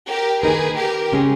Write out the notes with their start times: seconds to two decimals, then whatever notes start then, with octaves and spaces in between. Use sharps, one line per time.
0.09 G4 A#4
0.43 D#3 A#3 D#4 G#4 A#4 B4
0.77 G4 A#4
1.12 C#3 G#3 C#4 G#4